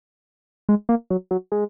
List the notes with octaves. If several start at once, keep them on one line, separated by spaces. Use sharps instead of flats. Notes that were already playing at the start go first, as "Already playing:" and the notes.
G#3
A#3
F#3
F#3
G#3